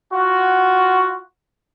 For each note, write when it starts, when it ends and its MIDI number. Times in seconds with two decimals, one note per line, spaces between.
0.13 1.20 65
0.13 1.20 66